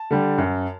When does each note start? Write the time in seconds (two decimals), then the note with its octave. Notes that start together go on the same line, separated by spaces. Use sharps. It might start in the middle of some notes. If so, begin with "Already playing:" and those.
Already playing: A5
0.11 D3 G3
0.38 F#2